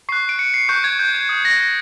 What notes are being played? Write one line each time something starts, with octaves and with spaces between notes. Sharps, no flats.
C#6 F#6 C7
D7
C#7
C7
C#6 F#6 G6
G#6
G6
G#6
D#6 G6
A#6
A#6